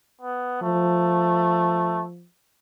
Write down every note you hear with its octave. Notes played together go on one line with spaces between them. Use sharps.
B3
F3 A3